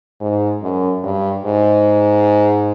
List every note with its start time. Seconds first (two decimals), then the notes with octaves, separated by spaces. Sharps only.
0.21 G#2
0.62 F#2
1.04 G2
1.45 G#2